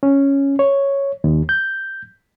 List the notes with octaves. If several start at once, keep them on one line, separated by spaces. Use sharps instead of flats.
C#4
C#5
D#2
G6